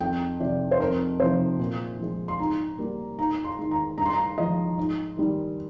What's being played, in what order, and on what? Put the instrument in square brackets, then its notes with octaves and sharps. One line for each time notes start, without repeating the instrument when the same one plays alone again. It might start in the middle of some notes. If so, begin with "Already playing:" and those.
[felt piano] F2 G5
C3 F3 D5
C5
F2 A#4
C3 F3 C5
A#2
F3 G#3
C6
G#2 A#5
G3 A#3
G#2 A#5
C6
D#3 G#3
A#5
G2 A#5
C6
A#5
F3 G#3 D#5
G#2
D#3 G3